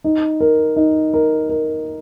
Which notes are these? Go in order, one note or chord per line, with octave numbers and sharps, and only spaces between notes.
D#4
A#4
D#4
A#4
A#4